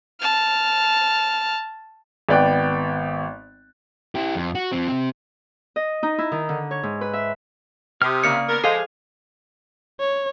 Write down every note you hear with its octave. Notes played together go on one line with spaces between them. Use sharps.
A5 F6
G#1 B3 D5 G5 F#6
E4 G4
F2
F#4
F3 C4
C3 C4
D#5
D#4
E4
D#3
D3
C#5
G#2
B4
E5
C3 D#6 F6
C#3 A#3 D5 C#7
B3 A#4
F3 G#3 G#4 A4 C5 F5 C7
C#5